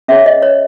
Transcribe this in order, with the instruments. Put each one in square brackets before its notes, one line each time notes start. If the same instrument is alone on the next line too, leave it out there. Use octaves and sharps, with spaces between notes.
[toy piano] C#4 G#4 C#5 E5
D#5
C#5